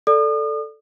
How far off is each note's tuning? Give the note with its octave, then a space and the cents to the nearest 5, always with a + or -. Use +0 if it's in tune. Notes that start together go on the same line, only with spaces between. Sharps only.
A4 +0 D5 +0 D#6 -40